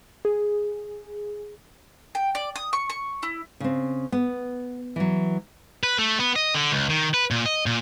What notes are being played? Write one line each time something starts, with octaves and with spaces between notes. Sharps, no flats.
G#4
G5
D5
D#6
C#6
C#6
E4
C#3 C4
B3
E3 F#3
B4
A3
B3
D#5
D3
C#2
D#3
B4
A#2
D#5
A#2